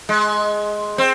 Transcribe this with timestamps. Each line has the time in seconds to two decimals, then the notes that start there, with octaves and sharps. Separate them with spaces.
0.09 G#3
0.98 C4